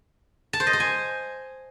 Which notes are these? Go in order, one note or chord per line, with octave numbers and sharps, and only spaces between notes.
A5
C5
D#5
C5
G#5